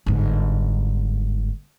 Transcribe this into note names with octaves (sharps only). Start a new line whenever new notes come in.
G1 G#2